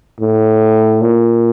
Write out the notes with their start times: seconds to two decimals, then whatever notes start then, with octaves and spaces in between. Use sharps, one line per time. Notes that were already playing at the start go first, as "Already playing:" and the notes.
0.21 A2
1.01 A#2